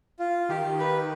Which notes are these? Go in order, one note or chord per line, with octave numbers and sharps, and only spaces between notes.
F4
D#3 G4
B4